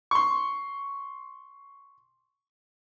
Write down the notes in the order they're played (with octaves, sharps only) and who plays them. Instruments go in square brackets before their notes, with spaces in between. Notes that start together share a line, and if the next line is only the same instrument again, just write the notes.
[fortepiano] C6 C#6